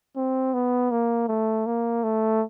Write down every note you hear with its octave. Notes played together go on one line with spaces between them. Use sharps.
C4
B3
A#3
A3
A#3
A3